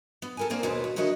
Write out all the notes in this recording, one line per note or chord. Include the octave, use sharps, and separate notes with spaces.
B3
A4 A#4 G#5
A#3 C4 C5 D5
D#2 B2 G#3 B3 B4 C5
F#4
D3 D#3 F#4 C#5 D#5 E5